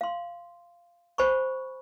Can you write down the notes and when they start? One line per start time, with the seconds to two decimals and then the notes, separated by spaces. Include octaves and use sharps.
0.01 F5 C6
1.18 C5 G#5 B5 C#6